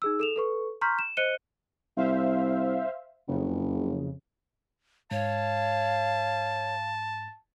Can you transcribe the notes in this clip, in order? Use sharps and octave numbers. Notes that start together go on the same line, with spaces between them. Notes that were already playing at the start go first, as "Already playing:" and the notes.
D#4 G#4 E6
A4 E7 F7
A4 B4 C#6
A#5 C6 C#6 F6 G6 B6
E7
C5 D#5 F#6 C#7 D#7 G7
C2 C5 E5 F5
F#1 F2 C#3
G#2 C#5 F5 A5